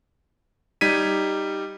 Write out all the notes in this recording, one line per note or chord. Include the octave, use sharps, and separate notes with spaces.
G3 D#4 G#6 B6 D#7